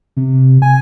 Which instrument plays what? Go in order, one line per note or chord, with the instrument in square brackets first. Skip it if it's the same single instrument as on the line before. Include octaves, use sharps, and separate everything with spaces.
[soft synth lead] C3
G#5